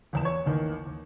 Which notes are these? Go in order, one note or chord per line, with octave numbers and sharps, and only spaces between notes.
D#1 E2 E7
C#5
A1 D#2 D#3
D#2